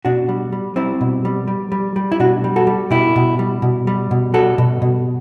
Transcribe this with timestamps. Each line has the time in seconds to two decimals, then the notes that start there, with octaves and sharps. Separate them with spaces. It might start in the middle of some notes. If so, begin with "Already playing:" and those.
0.05 B2 D4 F#4
0.29 G3
0.52 G3
0.76 G3 C4 E4
1.01 B2
1.25 G3
1.48 G3
1.72 G3
1.96 G3
2.12 E4
2.20 B2 D4 F#4
2.44 G3
2.56 F#4 A4
2.67 G3
2.90 B2 E4 G4
3.16 B2
3.39 G3
3.62 B2
3.87 G3
4.11 B2
4.34 G3 F#4 A4
4.58 B2
4.82 B2